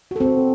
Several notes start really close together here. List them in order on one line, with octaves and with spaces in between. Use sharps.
F#4 A4 C4